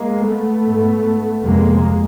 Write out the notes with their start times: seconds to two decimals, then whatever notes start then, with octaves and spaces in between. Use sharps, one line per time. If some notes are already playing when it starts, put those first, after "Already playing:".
Already playing: G#3 A#3
0.27 A3 B3
0.66 G#2
1.43 F2 C3 G#3 A#3